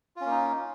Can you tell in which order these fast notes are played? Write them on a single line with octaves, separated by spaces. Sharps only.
F4 C#4 A#3 D#4